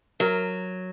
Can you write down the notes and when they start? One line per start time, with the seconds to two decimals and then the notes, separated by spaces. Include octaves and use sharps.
0.20 F#3 A#4